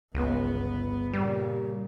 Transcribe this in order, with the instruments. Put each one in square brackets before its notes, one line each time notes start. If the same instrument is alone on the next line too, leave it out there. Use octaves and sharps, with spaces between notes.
[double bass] G1 B3 [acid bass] C#2
[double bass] A#2 C#3 [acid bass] G3